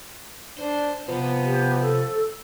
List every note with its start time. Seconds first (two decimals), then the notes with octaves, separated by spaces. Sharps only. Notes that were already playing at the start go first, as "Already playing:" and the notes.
0.58 D4 C5
1.08 C3 F3 B3 C5
1.44 G4
1.81 A4